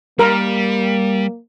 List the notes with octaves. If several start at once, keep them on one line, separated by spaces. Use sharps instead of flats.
G3 A#3 A#4